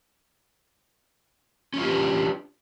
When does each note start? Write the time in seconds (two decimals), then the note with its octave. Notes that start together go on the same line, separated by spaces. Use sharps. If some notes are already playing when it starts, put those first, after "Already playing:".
1.74 C#4
1.78 F4
1.82 G4
1.86 B4
1.91 D4